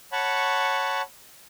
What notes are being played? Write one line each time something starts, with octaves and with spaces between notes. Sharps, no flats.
C#5 F#5 A5 B5 C#6